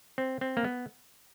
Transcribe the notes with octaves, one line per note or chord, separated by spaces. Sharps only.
C4
C4
A#3
B3